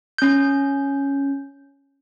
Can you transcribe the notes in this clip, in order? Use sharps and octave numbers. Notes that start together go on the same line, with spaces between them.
C#4 G6